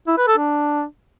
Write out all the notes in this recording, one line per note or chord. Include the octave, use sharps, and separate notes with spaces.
E4
B4
A4
D4